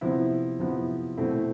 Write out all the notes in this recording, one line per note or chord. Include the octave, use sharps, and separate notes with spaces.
C3 F3 B3 E4
C3 F3 B3 E4
B2 A3 C4 E4